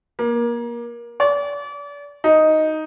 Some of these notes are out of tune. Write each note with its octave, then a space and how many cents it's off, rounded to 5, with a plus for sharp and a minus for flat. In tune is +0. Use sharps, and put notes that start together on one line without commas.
A#3 +25
D5 -35
D#4 +5